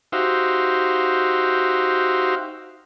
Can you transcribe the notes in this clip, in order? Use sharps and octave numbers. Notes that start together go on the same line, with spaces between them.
D#4 F#4 G4 C5 E5 F5